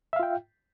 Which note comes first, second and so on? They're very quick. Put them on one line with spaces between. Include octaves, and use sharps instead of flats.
E5 F5 F4 G5